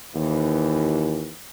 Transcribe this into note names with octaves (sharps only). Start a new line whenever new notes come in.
D#2 E3